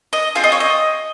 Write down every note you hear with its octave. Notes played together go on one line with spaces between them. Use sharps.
D#5
C4 F4 G#4 F5
D#5
C#5
D#5